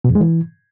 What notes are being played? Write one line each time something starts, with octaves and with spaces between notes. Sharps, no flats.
B2
F2
G#3
E3